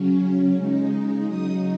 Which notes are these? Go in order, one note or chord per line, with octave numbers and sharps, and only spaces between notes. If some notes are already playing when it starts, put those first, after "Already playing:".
Already playing: C#3 F#3 C#4
C#3 G#3 D#4
C#3 F#3 D#4 D#6